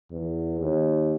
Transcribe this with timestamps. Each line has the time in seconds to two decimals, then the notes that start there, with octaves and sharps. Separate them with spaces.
0.12 E2
0.60 D#2